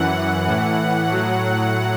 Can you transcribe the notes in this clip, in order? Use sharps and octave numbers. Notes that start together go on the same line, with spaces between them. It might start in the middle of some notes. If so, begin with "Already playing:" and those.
Already playing: F#2 E3 F#5
A2 E3
A2 F#3